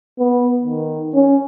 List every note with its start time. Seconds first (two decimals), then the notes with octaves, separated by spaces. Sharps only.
0.19 B3
0.64 D#3
1.14 C#4